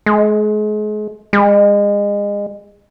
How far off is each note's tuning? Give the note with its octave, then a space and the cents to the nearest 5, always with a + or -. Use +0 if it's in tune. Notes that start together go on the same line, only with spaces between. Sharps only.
G#3 +35
G#3 -30